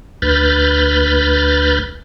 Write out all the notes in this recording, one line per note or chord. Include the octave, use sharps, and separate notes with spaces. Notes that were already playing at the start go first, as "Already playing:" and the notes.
D2 B4 B5 F6 G6 A6